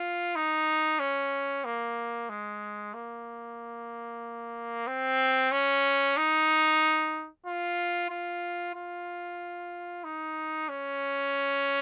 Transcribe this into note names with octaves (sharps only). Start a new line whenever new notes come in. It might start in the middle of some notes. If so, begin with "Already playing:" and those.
Already playing: F4
D#4
C#4
A#3
G#3
A#3
C4
C#4
D#4
F4
F4
F4
D#4
C#4